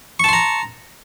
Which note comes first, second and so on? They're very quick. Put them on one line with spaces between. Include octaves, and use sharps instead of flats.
C#6 A5 C6 A#5